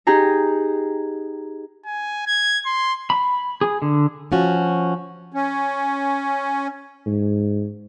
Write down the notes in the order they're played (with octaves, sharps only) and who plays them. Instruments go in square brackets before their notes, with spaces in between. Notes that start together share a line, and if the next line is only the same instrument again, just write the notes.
[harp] D#4 G4 G#4 A#5
[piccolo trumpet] G#5
G#6
C6
[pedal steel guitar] B5
G#4
D3
[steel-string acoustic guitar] F3 C#4 F#4
[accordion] C#4
[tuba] G#2